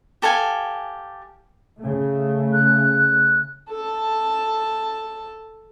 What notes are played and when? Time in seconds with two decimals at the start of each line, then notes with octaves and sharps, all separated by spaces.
0.22 G4 A4 F5 G#5
1.80 C#3 A3
2.53 F#6
3.69 A4 A5